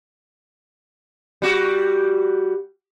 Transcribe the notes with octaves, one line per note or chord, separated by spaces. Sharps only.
G3 F#4